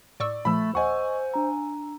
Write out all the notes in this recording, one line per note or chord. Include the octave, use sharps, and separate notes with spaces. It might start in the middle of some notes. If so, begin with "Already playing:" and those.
A2 D5 C#6 E6
A#2 F3 A3 B5 E6
D#2 C5 D#5 F#5 G#5 C#6
D4 A#5